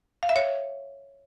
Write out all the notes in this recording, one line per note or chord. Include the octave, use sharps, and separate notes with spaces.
F5
E5
C#5